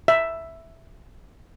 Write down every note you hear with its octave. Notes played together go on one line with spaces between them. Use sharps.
E5